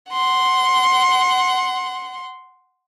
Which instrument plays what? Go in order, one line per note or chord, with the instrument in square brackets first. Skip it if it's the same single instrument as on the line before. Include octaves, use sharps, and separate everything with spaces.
[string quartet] F#5 C6